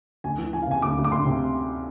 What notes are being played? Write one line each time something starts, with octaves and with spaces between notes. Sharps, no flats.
D2 G#5
E3
E3 G#5
F5
C3 G#5
D2 D6
D2
D6
D2 C6
C3